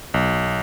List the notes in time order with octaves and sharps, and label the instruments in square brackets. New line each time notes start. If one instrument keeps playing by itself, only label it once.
[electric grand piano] B1